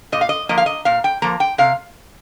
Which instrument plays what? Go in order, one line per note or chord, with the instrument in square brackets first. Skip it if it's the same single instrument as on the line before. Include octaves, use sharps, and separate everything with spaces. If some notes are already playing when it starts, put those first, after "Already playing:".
[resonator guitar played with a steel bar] A#2 D#5
F5
D#5
F3 A#3 D#5
F5
D#5
A#2 F5
G5
F3 A#3 A#5
G5
C3 F5